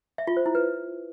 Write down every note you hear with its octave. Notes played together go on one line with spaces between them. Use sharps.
E5
F4
C5
E4
B4